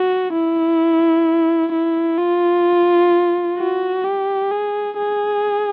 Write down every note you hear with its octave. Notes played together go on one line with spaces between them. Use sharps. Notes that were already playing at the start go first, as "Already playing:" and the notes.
Already playing: F#4
E4
E4
F4
F#4
G4
G#4
G#4